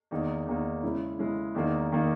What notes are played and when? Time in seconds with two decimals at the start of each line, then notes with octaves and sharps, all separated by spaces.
0.11 E2 D#3 A#3 D#4
0.47 E2 D#3 A#3 D#4
0.83 C#3 G#3 C#4 E4
1.19 C#3 G#3 C#4 E4
1.55 E2 D#3 A#3 D#4
1.92 D#3 A#3 D#4